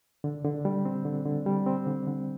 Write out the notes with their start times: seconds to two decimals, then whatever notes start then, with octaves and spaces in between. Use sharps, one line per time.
0.24 D3
0.45 D3
0.65 G3
0.85 C4
1.05 D3
1.26 D3
1.46 G3
1.67 C4
1.87 D3
2.07 D3